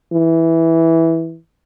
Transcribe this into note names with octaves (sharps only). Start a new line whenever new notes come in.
E3